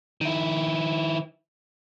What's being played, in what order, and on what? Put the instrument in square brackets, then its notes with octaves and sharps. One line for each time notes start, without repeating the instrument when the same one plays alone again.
[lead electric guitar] D#3 E4